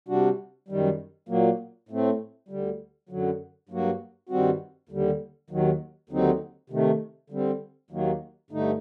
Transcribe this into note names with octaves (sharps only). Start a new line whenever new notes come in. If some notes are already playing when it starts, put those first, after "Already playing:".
C3 G3 D4 F#4
F#2 D#3 G3
A#2 F#3 A#3
A2 A3 C4
D2 D3 G3
F#2 D3 F#3
G2 F#3 A#3 F#4
G2 D#3 G3 C4 F#4
D#2 D3 G3
D#2 D#3 F#3
D#2 D3 F#3 C4 D#4
C3 D#3 A3
D3 G3 C4
D#2 D#3 F#3 A#3
G2 D3 A3 D#4